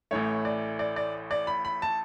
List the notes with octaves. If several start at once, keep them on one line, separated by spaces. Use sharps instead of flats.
A1 A2 E3 A3 C#5
D5
D5
D5
D5
B5
B5
A5